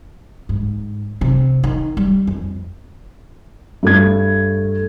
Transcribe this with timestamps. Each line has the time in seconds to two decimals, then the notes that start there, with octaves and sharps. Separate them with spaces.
0.49 G#2
1.21 C3
1.63 D#3
1.97 G3
2.27 F2
3.83 G2 A3 G#6